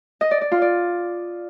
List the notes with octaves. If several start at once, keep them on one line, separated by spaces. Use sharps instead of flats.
D#5
D5
D5
F4
D5